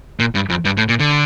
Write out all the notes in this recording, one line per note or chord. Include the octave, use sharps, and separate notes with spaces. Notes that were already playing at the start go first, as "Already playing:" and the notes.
A#2
G2
F2
G2
A2
A#2
D3